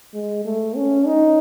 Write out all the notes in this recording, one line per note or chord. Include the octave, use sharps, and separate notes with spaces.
G#3
A3
C#4
D#4